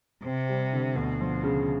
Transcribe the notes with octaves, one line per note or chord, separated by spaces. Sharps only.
C3 C4
G3
D3
D2 B2
F3
C#3